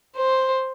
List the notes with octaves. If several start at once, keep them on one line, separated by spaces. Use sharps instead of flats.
C5